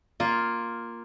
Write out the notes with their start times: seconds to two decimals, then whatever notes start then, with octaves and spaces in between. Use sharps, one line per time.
0.20 A#3 F4